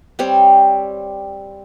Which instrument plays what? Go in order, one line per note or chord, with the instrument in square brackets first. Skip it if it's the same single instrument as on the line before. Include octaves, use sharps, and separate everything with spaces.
[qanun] G3 C4 C#5